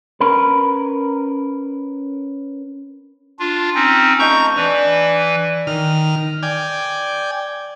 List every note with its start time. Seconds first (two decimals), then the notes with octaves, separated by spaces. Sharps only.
0.20 C#4 A#4 B4
3.39 D4 F4
3.75 C4 C#4 D#4
4.19 F3 A3 D#5 A#5 C#6 G6
4.56 E3 D4 B4
5.67 D#3 F6
6.43 D5 G5 G#5